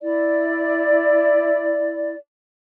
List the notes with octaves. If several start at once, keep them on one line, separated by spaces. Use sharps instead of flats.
E4 D5